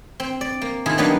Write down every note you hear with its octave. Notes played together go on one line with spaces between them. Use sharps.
C4
D5
A#3
D#3 E4 F4 G#4 A5
F#3 G3 A#3 B3 D4 D#4